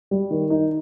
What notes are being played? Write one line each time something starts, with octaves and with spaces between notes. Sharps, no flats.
G3
D#3
D#4